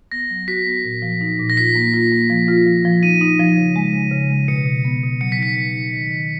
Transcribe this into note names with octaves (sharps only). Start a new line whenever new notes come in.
B3 A#6
F#3
F#4 B6
B3
A#2
F3
D#4
A#2
A#6
F4 B6
A#3
F4
A#3
F3
F4
F3
F3
D#4 D#7
D#4
F3
C#3
G#3
C#3
C#3
G#3
B2 C#7
B2
B3
B2
F#3 C#7
B6
D#4 C#7
B2
D#4
D#3
D#3